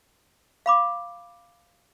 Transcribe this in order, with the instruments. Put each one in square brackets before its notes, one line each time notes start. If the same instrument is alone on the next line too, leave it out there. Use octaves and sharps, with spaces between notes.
[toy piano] F5 B5 D6